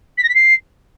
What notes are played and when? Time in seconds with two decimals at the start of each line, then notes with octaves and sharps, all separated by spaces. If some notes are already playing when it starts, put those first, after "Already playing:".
0.18 B6
0.23 A#6
0.29 B6
0.35 C7